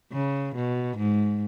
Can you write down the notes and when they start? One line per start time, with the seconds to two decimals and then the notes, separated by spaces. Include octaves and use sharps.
0.12 C#3
0.55 B2
0.97 G#2